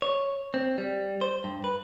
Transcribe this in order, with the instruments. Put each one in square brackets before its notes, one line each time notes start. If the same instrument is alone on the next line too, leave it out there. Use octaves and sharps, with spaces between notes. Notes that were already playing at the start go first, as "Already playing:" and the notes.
[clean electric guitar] C#5
C4
G3
C5
G2
B4